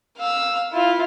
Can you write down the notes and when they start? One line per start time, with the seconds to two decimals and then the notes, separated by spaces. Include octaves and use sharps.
0.18 F5 E6
0.72 E4 F4